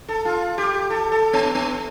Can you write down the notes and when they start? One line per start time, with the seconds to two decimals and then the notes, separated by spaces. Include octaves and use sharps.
0.08 A4
0.25 F4
0.58 G4
0.90 A4
1.12 A4
1.33 B3
1.55 B3